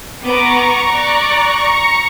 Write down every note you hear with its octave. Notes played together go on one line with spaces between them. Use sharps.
B3 A#5 C#6 D6
D5 D6 F#6
C#7